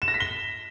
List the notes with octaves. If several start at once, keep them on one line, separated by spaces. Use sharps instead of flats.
E7
A#6
B6
G7